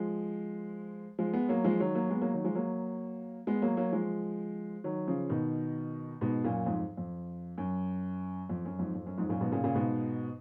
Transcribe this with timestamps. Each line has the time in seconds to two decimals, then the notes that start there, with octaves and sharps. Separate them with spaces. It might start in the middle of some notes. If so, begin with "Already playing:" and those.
Already playing: F3 G#3
1.19 F3 G#3
1.33 G#3 B3
1.49 F#3 A#3
1.64 F3 G#3
1.80 D#3 F#3
1.95 F#3 A#3
2.10 G#3 B3
2.22 F#3 A#3
2.33 D#3 F#3
2.45 F3 G#3
2.55 F#3 A#3
3.47 G#3 B3
3.62 F#3 A#3
3.77 F#3 A#3
3.92 F3 G#3
4.84 D#3 F#3
5.07 C#3 F3
5.30 B2 D#3
6.21 G#2 B2
6.44 F#2 A#2
6.66 F2 G#2
6.97 F2
7.58 F#2
8.49 F2
8.65 F#2
8.79 F2 G#2
8.95 F2
9.06 F#2
9.18 F2 G#2
9.29 F#2 A#2
9.41 G#2 B2
9.52 A#2 C#3
9.64 A#2 C#3
9.74 G#2 B2